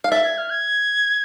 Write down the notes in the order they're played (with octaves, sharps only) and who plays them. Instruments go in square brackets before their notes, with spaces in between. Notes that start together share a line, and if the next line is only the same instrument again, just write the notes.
[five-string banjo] F5
[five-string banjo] E5 [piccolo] A6
[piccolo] G#6
F6
G#6